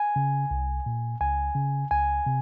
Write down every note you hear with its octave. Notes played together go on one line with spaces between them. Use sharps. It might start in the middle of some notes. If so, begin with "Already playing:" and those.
Already playing: G#5
C#3
C2
A#2
C#2 G#5
C#3
C#2 G#5
C3